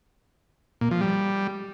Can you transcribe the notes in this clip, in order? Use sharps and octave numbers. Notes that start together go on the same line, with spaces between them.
A#2
F3
G3